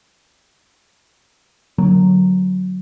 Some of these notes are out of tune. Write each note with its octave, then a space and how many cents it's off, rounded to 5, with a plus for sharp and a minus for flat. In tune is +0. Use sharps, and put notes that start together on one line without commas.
D3 +0 F#3 +0 A#3 -15